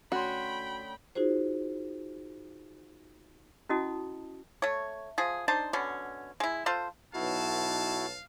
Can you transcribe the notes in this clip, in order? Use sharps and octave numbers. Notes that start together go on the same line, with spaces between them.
D2 C#4 F#4 G5 B5 C6
D#4 F4 F#4 G#4 C5
C#4 E4 F#4 D#5 A5 D#6
A3 C#5
F3 G#4
D4 D#4 C5 A5
B2 D3 C#4
G#3 E4
F4 A4 C5
B1 E4 F#4 F5 A5